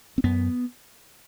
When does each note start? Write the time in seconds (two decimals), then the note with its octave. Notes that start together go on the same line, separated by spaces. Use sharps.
0.18 C4
0.24 F#2 B3